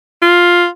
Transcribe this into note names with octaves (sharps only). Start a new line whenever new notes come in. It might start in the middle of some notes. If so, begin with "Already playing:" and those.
F4